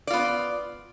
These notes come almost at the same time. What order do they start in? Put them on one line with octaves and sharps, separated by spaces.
D5 F4 B3